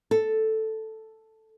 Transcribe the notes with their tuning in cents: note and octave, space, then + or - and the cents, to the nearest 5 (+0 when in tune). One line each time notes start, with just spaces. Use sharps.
A4 +0